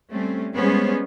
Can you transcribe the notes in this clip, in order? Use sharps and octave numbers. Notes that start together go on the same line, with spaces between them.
G3 A3 C4 C#4
G3 G#3 B3 C#4 G#4 C5